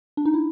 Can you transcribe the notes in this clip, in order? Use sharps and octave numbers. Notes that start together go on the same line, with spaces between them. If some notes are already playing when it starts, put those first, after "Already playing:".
D4
D#4
E4